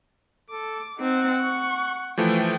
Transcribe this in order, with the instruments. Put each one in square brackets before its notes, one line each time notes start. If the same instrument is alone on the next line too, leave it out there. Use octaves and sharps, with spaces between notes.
[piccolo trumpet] A4 [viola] D6
[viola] C4 D#4 [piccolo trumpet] F#5
[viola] C#6
[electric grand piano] E3 F3 A3 [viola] G5